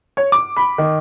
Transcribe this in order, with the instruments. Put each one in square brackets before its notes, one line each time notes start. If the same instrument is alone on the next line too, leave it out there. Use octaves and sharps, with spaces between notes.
[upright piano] C#5
D6
B5
D#3